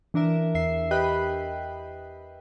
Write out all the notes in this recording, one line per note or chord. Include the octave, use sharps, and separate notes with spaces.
E3 D4 A#4 E5
E2 E5 C7
G4 B4 D#5 G5 B5 F#6